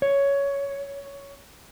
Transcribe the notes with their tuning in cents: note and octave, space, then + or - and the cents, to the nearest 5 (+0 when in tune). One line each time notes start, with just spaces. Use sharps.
C#5 +10